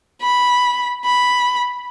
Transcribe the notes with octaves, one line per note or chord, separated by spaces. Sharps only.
B5
B5